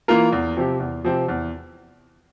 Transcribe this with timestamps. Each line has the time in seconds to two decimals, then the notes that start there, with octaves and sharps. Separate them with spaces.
0.08 E3 A#3 F4 A#4
0.32 E2
0.57 C3 F3 C4 G4
0.80 E2
1.04 C3 F3 C4 G4
1.28 E2